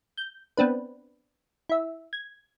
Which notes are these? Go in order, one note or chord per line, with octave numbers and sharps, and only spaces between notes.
G6
B3 C4 D4 B4
E4 E5
G#6